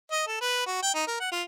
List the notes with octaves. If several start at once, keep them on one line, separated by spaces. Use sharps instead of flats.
D#5
A4
B4
F#4
G5
D#4
A#4
F#5
F4